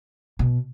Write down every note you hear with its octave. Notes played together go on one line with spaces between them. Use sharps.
B2